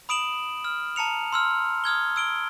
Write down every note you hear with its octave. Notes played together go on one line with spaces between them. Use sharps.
B5 D#6 D7 E7 F#7
F6
A5 A#5 C#7 F7
C6 E6 F6
D#6 F6 G#6 G7
E6 D7 G7